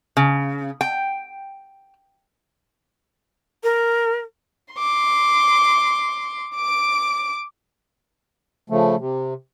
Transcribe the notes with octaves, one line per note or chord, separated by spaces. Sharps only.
C#3
G5
A#4
C6 D6
D6 D7
C#3 F3 A3
C3